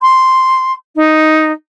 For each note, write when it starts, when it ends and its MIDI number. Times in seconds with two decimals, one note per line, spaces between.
0.01 0.72 84
0.95 1.51 63